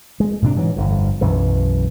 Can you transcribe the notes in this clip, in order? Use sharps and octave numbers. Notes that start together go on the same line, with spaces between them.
G#3
A2 C3 D4
G#2 E3 F#3
G1 F2
B1 F#2 E3